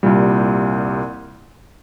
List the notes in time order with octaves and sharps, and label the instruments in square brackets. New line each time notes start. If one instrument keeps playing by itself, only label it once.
[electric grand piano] C2 A#2 G3